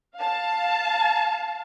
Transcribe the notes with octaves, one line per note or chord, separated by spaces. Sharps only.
F5 A5